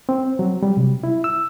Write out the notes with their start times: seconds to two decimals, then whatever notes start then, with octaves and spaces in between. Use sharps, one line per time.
0.09 C4
0.39 F#3
0.63 G3
0.77 C3
1.04 E4
1.24 E6